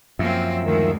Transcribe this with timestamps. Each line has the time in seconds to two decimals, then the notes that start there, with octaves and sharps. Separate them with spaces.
0.19 F#2 F3 A#3 C4 E5
0.65 D2 D#3 G#3